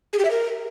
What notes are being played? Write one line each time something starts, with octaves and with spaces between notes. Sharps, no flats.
G#4
G4
E5
A#4